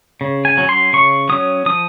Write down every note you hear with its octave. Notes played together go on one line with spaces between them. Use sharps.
C#3
G#5
F#3 C#4
C6
C#3 C#6
F#3 C#4 D#6
F3 D#6